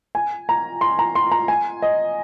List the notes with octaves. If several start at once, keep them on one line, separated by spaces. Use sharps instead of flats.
G#5
A#5
C6
A#5
C6
A#5
G#5
D#5